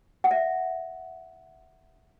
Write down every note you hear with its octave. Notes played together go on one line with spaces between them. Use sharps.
F#5
E5